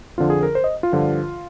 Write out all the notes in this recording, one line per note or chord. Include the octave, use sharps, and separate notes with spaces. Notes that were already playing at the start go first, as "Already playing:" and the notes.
F2 D3 F3 F4
G#4
A#4
C5
D#5
F4
G2 D3 F3